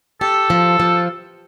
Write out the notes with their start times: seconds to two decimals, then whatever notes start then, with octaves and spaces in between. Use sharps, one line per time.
0.21 G4 A4
0.50 F3
0.80 F3